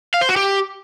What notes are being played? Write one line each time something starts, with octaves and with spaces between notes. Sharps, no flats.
F5
C5
F#4
G4